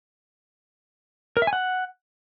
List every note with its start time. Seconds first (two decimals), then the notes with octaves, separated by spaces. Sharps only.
1.37 A#4
1.42 E5
1.47 G#5
1.53 F#5